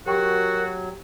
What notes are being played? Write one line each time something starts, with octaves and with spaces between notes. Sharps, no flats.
F#3 F#4 G4 A#4 G5 C#6